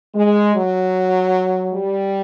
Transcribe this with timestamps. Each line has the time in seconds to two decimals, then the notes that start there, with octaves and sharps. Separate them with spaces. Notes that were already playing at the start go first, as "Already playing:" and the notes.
0.15 G#3
0.55 F#3
1.74 G3